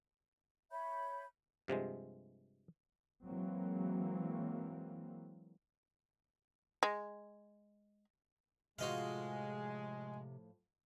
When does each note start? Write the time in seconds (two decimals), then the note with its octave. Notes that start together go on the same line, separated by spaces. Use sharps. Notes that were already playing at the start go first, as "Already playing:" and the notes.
0.71 C#5 E5 B5 G6
1.68 G2 C3 F3 G#3
3.24 E3 F#3 G#3 A#3 C4
6.83 G#3
8.79 A2 C3 F3 G#3 F4 F#4 D#5 F5